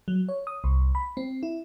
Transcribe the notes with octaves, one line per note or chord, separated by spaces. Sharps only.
F#3
C#5
D#6
C2
B5
C4
E4